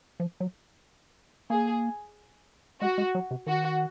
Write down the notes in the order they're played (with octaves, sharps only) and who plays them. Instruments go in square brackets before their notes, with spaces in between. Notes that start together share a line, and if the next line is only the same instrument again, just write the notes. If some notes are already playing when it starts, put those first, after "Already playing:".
[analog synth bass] F3
F#3
[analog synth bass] A#3 [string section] G#4
[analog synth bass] G#3 [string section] F#4
[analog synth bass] G#3
F#3
C3
[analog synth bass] D#3 [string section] F#4